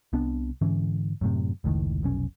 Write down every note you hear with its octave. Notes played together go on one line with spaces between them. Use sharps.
C2 C3 B3 D4
G#2 D3 E3 C#4
F#2 A2 C3
F1 C#2 A2 D#3
F1 B1 C#4